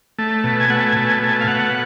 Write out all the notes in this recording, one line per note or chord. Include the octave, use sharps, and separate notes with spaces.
A3
B2
G#5
A3 F#5
G#5
B2
G#5
A3
G#5
F5
B2 F#5